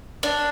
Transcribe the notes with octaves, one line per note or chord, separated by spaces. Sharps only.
D4